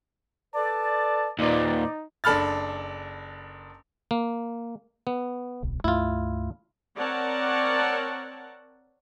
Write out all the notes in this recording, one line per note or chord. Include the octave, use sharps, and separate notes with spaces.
A4 B4 D5 A5
D#2 A#2 D#4 B4 C5 D5
F#1 D4 A4 B5 F6 A6
A#3
B3
D1 B1
C#2 G2 A3 E4 F4
C4 A#4 C#5 D5 F#5 A5